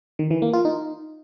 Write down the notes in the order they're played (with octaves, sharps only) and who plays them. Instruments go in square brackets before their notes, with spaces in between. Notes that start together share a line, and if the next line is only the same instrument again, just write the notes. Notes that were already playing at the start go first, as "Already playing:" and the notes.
[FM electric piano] D#3
E3
A#3
F4
D#4